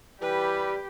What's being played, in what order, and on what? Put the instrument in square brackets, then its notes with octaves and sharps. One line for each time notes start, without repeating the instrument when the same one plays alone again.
[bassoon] E3 [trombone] G3 [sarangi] G4 [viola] B4